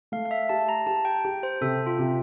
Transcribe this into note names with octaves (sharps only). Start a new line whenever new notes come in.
A3 F5
F5
E5
G4 A5
A#5
G4 A5
G5
G4
C5
C3 A4
F4
C3